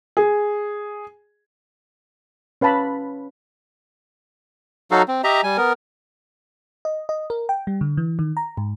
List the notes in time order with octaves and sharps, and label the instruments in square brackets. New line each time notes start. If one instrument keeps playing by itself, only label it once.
[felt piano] G#4
[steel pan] C#4 B4 F5 A5 B5
[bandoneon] F#3 D#4 F#4 A4 F5
C4
G4 D#5 E5 A#5
G3 G#5
B3 A#4
[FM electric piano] D#5
D#5
A#4
G5
G3
D3
E3
D#3
A#5
G#2